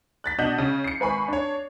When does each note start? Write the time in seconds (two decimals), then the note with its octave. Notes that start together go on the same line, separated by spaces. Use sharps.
0.24 F#6 A6 B6
0.38 B2 D4 D#5 F#5 G6 F#7
0.58 C#3
0.84 C7 C#7
1.00 G#1 B4 G#5 B5 C#6
1.28 D4 C#5